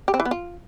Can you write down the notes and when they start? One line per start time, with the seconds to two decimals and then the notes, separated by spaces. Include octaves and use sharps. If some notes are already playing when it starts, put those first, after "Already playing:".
0.08 G4
0.14 C4
0.20 E3
0.25 B3
0.31 F4